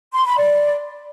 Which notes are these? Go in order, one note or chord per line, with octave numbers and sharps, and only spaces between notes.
C6
B5
D5